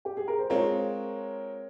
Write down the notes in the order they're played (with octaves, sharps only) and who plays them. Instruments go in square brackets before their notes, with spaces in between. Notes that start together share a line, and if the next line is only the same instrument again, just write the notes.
[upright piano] G4
G#4
A#4
C5
[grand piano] G#3 C4 F4 [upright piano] A#4 C#5